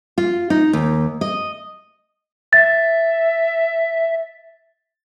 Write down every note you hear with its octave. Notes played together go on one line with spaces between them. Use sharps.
F4
D#4
D#2
D#5
E5 A6